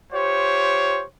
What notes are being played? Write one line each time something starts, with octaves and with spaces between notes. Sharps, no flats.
F4 G4 C5 C#5